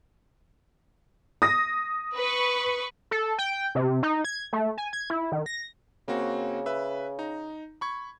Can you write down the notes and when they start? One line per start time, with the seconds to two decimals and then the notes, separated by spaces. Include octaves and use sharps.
1.42 D#6 A#6
2.16 B4 C#6
3.11 A4
3.39 G5
3.75 C3
4.03 D#4
4.25 G#6
4.53 A3
4.78 G#5
4.93 G#6
5.10 E4
5.32 D#3
5.46 A#6
6.08 C#3 A#3 C4 F#4
6.66 B4 E5
7.19 D#4 A#5
7.81 B5 C#6 G#6